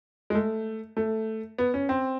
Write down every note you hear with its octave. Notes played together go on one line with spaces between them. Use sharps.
G#3
A3
A3
B3
C#4
C4